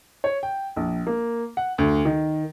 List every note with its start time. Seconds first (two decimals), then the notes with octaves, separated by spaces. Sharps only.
0.24 C#5
0.43 G5
0.76 A#1
1.07 A#3
1.57 F#5
1.78 D2
2.05 D#3